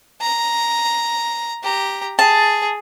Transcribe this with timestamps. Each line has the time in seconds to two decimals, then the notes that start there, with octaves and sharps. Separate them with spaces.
0.21 A#5
1.63 G4 A#5
2.19 G#4 A5